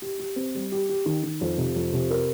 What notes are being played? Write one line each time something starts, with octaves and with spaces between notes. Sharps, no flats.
G4
G4
C4
G3
G4
G4
D#3
D#3
F2
C3
F2
C3
A#4